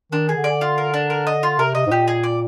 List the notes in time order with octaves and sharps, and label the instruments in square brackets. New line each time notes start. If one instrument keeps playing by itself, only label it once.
[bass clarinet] D#3 [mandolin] D4
[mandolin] G#4
[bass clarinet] D3
[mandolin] D5
F4
A#4
D4
A#4
D#5
F4
[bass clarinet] C3 [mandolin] A#4
[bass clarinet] C3 [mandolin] D#5
[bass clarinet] G#2
[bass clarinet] A#2 [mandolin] G4
[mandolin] G#4
D5